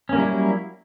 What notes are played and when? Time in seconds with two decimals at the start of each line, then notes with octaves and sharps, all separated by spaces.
0.09 C#4
0.13 A#3
0.16 G3
0.20 E4
0.23 F#3